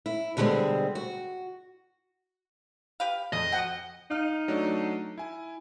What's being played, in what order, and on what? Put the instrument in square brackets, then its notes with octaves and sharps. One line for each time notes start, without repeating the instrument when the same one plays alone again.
[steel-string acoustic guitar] E4
B2 D3 G3 G#3 C4
F#4
[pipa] G4 B4 F5
[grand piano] F2 [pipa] G#4 [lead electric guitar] D#5
[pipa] C4 F#4 [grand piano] F#5
[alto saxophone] D#4 [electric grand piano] F5 F6
[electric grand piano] F#3 A3 D4
E4 G#5